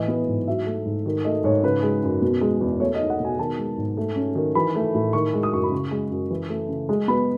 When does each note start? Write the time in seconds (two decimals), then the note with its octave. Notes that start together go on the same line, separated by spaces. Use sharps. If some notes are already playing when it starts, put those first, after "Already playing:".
Already playing: A2 E3 D#5
0.08 B3
0.28 G#2
0.48 F#3 E5
0.66 A3
0.85 G#2
1.06 D#3
1.25 A3 D#5
1.44 G#2 C#5
1.63 C#3 B4
1.83 G#3
2.03 F#2
2.22 B2
2.41 G#3
2.61 E2
2.80 A3 C#5
2.94 D#5
2.99 D#4
3.10 F#5
3.20 B2 G#5
3.39 D#3 A5
3.58 G#3
3.78 G#2
3.97 A3
4.16 C#4
4.35 D#3
4.55 E3 B5
4.75 A3
4.95 A2
5.13 D#3 C#6
5.34 G#3
5.43 D#6
5.53 F#2 C#6
5.63 B5
5.72 C#3 C#6
5.91 G#3
6.11 F#2
6.30 E3
6.49 A3
6.69 C#3
6.89 G#3
7.08 B3 B5